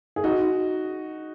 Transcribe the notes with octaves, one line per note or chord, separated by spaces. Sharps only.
G#4
D#4 F#4